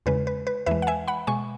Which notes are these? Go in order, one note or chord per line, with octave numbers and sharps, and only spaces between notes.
E2 C#3 G#3 B4
B4
B4
E2 E3 G#3 B4 E5
F#5
E5 G#5
F#5 B5
B2 G#3 G#5 C#6